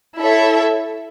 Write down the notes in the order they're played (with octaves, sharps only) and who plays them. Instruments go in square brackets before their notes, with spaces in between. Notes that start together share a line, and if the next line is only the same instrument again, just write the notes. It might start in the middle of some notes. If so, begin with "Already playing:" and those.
[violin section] E4 A4 C#5 E5